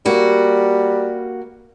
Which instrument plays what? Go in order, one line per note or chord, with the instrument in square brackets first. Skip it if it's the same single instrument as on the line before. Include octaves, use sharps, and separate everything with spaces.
[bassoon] G3 [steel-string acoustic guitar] A#3 F#4